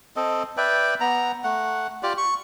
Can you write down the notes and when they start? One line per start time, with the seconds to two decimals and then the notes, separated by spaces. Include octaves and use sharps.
0.16 C4 A4 D#5
0.57 B4 D5 E5 G5
1.00 B3 A#5
1.44 A3 F#5
2.03 F4 G4 D5
2.17 C#6